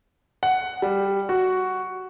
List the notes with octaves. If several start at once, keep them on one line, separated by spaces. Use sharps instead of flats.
F#5
G3
F#4